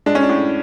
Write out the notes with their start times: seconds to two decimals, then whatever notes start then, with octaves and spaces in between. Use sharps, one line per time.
0.06 G#3 D4
0.15 C#4
0.23 D4
0.29 A2